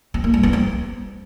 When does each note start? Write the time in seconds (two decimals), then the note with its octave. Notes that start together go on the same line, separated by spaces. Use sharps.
0.14 C4
0.24 A#3
0.34 G3
0.43 B3
0.53 C4